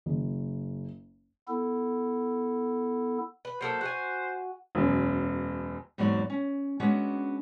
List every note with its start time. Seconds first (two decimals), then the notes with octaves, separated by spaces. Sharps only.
0.06 F#1
1.48 B3 E4 A4
3.45 B4
3.61 F#3 A#3 A4 C5
3.81 F#4 F#5 G#5
4.75 E1 F#2
5.98 E2 G#2 F#3 A#3 F#4 D5
6.30 C#4
6.80 G#3 B3 C#4 D4 F#4